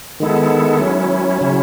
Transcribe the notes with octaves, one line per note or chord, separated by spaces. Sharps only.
D#3 G#3 B3 E4 A4
F#3 C#4 E4
C#3 F#3 C#4 E4